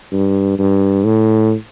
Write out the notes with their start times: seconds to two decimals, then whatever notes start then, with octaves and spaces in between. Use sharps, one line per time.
0.13 G2
0.58 G2
1.05 A2